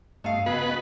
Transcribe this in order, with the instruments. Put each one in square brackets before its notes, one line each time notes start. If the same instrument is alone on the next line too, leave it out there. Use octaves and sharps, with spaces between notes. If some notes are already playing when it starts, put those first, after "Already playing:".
[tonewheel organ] G2 D#5 [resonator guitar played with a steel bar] A3 F5
[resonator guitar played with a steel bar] C#3 [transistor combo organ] B3 B4 [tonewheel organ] F#4 D#5